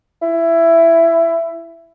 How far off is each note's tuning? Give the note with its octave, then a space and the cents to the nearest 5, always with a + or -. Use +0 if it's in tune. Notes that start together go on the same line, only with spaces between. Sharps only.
E4 +15